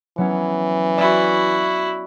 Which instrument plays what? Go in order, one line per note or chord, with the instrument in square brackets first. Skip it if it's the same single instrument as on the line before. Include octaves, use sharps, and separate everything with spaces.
[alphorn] E3 [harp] F#3 B3 C#4
[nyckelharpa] E4 F#4 [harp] D5